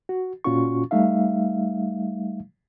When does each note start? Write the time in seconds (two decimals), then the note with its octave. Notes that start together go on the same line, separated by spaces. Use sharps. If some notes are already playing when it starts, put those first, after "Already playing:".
0.09 F#4
0.44 A#2 C#4 F4 F#4 C#6
0.91 G3 A3 D#4 E5 F5